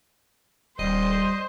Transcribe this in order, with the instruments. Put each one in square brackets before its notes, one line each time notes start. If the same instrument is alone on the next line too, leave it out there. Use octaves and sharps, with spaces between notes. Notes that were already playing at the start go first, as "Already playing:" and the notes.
[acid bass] D#1 [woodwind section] G3 [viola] C5 [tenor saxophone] D#5